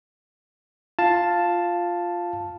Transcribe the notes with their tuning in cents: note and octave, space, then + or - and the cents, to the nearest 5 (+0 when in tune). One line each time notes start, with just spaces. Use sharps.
F4 +0 F5 +0 A5 +0